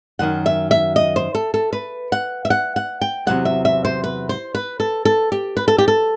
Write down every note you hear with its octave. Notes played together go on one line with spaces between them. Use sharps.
F#2 D#3 F#3 F#5
E5
E5
D#5
C5
A4
A4
B4
F#5
E5
F#5
F#5
G5
E2 C3 F#3 B3 F#5
E5
E5
C5
B4
C5
B4
A4
A4
G4
B4
A4
G4
A4